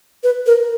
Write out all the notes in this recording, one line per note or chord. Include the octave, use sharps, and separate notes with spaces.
B4
A#4